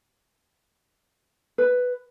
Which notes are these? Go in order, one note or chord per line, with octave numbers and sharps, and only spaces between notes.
B4